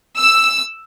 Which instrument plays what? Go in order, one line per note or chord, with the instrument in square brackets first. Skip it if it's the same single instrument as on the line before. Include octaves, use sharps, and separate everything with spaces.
[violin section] E6